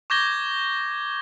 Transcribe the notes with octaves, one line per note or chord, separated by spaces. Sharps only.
C#6 D6 G6 G#6 A#6 G7